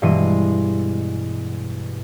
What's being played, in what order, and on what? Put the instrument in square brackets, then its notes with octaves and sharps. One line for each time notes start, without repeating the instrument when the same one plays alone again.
[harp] G2 B2 E3 G#3 C6 D#7